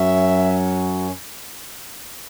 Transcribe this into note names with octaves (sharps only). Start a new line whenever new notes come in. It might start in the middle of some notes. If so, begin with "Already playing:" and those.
Already playing: F#2 F#3 C#4 E5